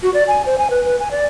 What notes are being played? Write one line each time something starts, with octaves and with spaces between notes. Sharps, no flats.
F#4
D5
G#5
C5
G#5
B4
B4
G#5
D5